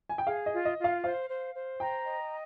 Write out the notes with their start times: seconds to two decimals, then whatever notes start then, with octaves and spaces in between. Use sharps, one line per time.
0.09 G#5
0.18 G5
0.26 G#4 F5
0.46 D#5
0.52 F4
0.65 D#5
0.78 F4
0.84 F5
1.04 C5 F5
1.29 C5
1.55 C5
1.80 G5 A#5
2.06 D#5